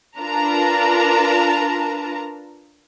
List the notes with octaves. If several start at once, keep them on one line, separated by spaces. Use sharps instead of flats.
D4 F4 A#4 B4 A5 A#5